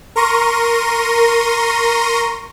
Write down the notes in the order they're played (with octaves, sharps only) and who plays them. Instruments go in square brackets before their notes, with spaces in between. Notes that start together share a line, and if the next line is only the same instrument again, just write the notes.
[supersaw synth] A#4 A#5 C6 C#6 A#6 D#7